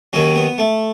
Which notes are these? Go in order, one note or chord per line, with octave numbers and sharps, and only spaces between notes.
D#2 D#3 F#3 C#4
B3
A3